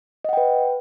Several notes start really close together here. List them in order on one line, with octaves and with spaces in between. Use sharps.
D#5 F#5 G5 B4